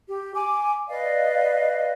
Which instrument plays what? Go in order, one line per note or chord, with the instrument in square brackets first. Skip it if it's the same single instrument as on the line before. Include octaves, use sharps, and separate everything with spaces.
[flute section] G4
G#5 D6
B4 D5 D#5 F5